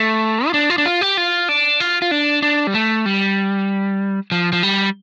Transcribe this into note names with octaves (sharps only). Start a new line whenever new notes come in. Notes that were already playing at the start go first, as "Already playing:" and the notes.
Already playing: A3
F4
D4
F4
D4
F4
G4
F4
D4
F4
F4
D4
D4
G3
A3
G3
F3
F3
G3